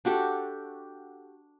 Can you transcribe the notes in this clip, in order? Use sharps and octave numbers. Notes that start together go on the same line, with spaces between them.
D4 F#4 G4 A4